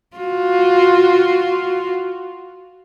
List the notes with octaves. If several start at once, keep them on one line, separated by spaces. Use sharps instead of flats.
F4 F#4